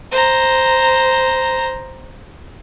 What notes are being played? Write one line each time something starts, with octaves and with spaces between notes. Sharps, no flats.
C5 A#5